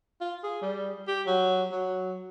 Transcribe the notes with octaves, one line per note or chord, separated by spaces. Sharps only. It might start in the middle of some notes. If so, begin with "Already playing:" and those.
F4
G#4
G3
G4
F#3
F#3